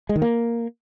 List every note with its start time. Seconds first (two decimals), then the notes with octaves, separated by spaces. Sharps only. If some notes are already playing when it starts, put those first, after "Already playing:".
0.09 G#3
0.16 D#3
0.22 A#3